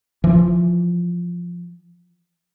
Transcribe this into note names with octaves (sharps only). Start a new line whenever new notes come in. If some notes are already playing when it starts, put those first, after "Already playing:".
E3 F3